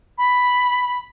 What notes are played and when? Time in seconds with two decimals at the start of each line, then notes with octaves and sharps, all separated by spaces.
0.18 B5